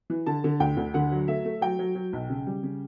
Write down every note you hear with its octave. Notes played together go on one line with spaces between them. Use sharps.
E3
D3 A5
D3
D2 G5
D2
D3 F#5
F#3
A3 E5
A3
F#3 G5
F#3
F#3
B1
C#3
G3
C#3